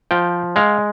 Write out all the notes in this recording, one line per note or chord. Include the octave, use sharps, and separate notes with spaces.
F3 G5
G#3 F5